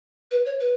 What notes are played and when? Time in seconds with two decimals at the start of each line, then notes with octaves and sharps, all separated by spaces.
0.31 B4
0.46 C#5
0.60 B4